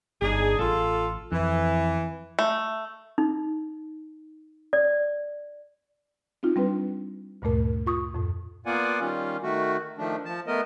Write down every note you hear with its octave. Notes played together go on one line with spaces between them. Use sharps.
G1 D4 D#4 G#4
A1 F4 A4
F2 E3
A3
D#4
D5
C4 D#4 F4
G3 C4 D4 B4
D2 G2 A#2 A3 A#4
F4 C#6 D#6
F2 A2
A#3 B3 F4 D5 F#5 G#5
D#3 G3 C#4 F4
D#3 A3 F#4
D#3 F3 A3 D4
F3 A5
A3 B3 A#4 D#5